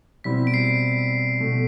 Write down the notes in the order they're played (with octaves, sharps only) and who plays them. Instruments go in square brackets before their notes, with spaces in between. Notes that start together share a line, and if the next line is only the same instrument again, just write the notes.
[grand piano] B2 G3 C4 E4 [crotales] B6
[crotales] D7
C7
[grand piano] B2 A3